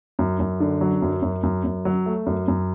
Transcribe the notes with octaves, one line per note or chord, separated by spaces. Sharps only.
F#2
F#2
D3
F#3
F#2
F#2
F#2
F#2
F#3
A3
F#2
F#2